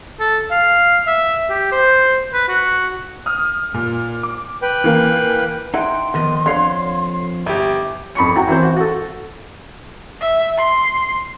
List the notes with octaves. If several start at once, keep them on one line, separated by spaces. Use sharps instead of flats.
A4
F5
E5
G4
C5
B4
F#4
D#6 F6
A#2
D6
B4 G5
E3 A#3 A#4
D#4 E4 F#5 G5 C6
F2 D#3 B3 D#5
F2 D3 C#5 F5
G1 E4 G4
F2 B5 C#6 C#7
E4 F#4 G5 A#5
E3 C4 C5
F#4
F#4 A4
E5
C6